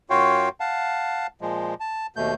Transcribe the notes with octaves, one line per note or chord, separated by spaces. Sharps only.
F#2 F4 F#4 C#5 F5 G5
F5 F#5 A5
A#2 F3 G#3
A5
D#2 B2 A3 G6